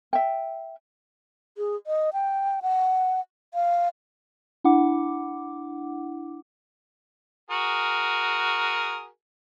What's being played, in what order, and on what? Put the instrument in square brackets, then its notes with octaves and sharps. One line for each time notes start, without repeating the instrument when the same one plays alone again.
[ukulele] E5 G5
[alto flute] G#4
D#5
G5
F#5
F5
[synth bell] D4 E4 F#5 D6
[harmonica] F#4 G#4 A#4